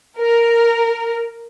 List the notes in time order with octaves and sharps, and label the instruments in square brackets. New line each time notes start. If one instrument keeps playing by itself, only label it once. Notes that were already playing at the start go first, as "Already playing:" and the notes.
[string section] A#4